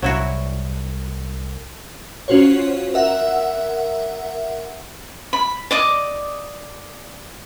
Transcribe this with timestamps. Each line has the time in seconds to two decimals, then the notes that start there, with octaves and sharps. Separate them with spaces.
0.02 C2 F#3 E4 F#4
2.28 C#4 F4 F#4 C5 C#5
2.94 A#4 E5 F#5
5.33 B5
5.71 D5 D#5 D6